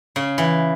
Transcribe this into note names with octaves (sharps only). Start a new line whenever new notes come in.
C#3
E3